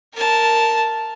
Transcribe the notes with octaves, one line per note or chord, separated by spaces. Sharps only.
A#4 A5